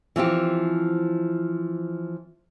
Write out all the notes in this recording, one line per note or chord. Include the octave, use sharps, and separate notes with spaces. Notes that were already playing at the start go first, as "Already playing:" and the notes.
E3 F3 C4 G4